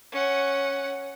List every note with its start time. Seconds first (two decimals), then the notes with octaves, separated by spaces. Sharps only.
0.12 C#4 F#5